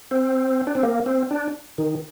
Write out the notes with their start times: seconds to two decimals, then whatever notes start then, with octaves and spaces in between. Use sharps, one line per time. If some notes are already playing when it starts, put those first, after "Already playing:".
0.11 C4
0.67 D4
0.75 C4
0.83 A#3
1.06 C4
1.31 D4
1.78 D#3